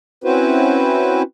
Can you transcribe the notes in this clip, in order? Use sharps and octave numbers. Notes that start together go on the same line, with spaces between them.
C4 C#4 E4 F#4 B4 C5